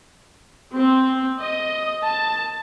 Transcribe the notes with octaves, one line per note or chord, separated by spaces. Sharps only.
C4
D#5
A5